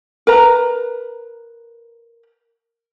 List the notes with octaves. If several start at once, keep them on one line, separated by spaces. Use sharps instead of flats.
A#4 B4 A#5